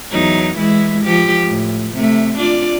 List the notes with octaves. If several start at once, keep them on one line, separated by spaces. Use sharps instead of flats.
E2 F#3 D#4
E3 G#3 E4
F3 G4
A2
C3 A3
D4 F4 D5